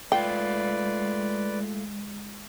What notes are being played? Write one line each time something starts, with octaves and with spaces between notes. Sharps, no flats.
G#3 A3 F4 B4 D5 G5